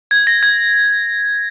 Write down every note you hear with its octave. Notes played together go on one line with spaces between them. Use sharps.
G#6
A#6
G#6